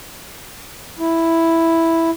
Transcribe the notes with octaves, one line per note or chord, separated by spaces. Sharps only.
E4